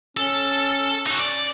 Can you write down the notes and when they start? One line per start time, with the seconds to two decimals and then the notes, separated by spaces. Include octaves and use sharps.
0.17 C#4 A4
1.07 D#4 F#4
1.20 D5